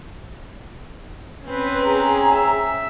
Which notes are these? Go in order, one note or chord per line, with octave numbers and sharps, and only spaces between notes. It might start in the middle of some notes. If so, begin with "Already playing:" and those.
C4 C#4 B4
G#4 A#5
E5